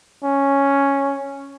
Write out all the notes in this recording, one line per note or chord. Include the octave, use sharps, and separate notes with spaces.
C#4